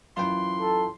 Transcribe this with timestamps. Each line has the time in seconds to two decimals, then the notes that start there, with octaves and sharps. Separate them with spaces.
0.17 F#2 E3 F4 B4 G5 C6
0.60 A4